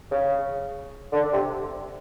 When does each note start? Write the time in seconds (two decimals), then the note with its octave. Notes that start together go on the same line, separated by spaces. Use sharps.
0.11 C#3
1.13 D3
1.32 C3